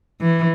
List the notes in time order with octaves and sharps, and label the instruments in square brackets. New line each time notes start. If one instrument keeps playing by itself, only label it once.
[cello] E3